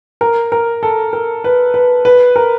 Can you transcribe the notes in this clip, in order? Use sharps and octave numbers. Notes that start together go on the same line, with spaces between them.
A#4
A#4
A4
A#4
B4
B4
B4
A#4